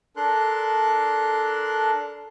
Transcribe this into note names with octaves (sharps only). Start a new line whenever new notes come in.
D4 A4 A#4 C6 F#6